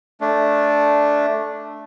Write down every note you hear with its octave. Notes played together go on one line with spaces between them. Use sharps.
A3 D4